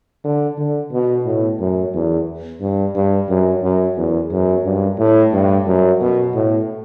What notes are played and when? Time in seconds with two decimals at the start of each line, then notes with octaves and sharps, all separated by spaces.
0.24 D3
0.58 D3
0.92 B2
1.25 A2
1.60 F#2
1.94 E2
2.61 G2
2.96 G2
3.29 F#2
3.63 F#2
3.97 E2
4.32 F#2
4.65 G2
4.99 A2
5.33 G2
5.67 F#2
6.01 B2
6.34 A2